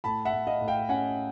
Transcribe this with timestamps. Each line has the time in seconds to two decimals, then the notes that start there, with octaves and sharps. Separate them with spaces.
0.04 A2 A5 B5
0.25 E5 F#5
0.33 A2
0.47 D#5 F5
0.61 A2
0.68 F5 G5
0.89 C#4 F#5 G#5